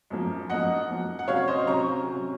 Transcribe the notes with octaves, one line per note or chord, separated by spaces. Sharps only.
F#2 F3 A#3
F#2 F3 A#3 D#5 F#5
F#2 F3 A#3
F#5
C3 F#3 C#4 C#5 F5
C5 D#5
C3 F#3 C#4 A#5 C#6
C3 F#3 C#4